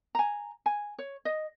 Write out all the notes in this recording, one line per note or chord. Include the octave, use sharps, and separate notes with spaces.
G#5 A#5
G#5
C#5
D#5